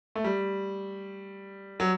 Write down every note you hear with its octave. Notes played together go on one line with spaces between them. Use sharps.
A3
G3
F#3